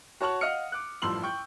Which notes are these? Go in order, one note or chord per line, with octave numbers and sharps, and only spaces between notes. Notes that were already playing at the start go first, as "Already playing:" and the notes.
F#4 C#5 A5 C#6 F#7
D#5 F5 F#5 D#6 F6 C#7
D6 F#6
A1 G2 F3 C6 E6 F#7
G5 C#6 G6